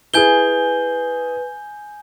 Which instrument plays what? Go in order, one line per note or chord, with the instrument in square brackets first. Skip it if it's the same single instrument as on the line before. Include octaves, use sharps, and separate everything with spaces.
[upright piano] E4 G#4 [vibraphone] B4 [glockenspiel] G#5 G6 G7